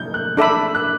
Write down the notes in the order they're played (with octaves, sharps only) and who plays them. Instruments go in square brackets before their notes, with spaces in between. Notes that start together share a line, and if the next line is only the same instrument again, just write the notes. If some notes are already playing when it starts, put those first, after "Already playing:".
Already playing: [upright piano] G6
F#6
[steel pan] D4 A4 E5 B5 [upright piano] D6
[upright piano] F#6